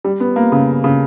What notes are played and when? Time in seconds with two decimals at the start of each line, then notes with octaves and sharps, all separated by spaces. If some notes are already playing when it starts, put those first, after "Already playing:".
0.04 G3
0.20 B3
0.36 A#3
0.52 C#3
0.84 C#3